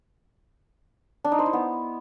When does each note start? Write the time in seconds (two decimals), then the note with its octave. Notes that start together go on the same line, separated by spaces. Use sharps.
1.24 D4
1.32 D#4
1.39 C5
1.46 E4
1.53 B3